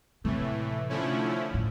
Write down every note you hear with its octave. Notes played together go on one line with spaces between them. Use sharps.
A2 C3 E3 A3
D3 F3 A3 C#4 E4
A2